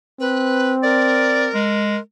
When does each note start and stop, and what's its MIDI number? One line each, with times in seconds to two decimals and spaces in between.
0.20 1.52 60
0.20 0.73 71
0.83 2.00 70
0.83 1.48 74
1.55 1.97 56